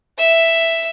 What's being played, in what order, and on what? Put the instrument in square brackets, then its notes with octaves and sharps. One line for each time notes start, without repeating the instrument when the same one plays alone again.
[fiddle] E5